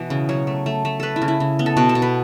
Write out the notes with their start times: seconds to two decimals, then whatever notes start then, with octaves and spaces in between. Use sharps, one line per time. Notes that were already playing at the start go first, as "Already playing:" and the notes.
Already playing: B2 E3
0.10 C#3
0.29 F#3 C#5
0.47 A3
0.66 A3
0.85 A3
1.00 A3 A4 B4
1.16 E4
1.22 C#3
1.28 E4
1.40 C#3
1.59 B3
1.66 A4
1.77 B2 F#4
1.89 A4
1.95 B2
2.02 B4